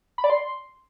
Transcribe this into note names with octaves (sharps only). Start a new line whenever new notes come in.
B5
D5
C6